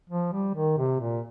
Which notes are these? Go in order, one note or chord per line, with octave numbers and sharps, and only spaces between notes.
F3
G3
D#3
C3
A#2